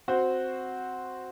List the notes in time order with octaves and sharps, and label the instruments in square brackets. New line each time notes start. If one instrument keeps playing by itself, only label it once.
[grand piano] C4 F#4 C5